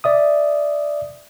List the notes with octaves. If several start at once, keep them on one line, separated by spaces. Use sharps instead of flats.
D5 E5 D#6